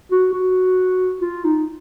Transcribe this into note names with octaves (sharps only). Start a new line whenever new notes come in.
F#4
F#4
F4
D#4